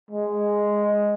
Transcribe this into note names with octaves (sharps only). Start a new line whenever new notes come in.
G#3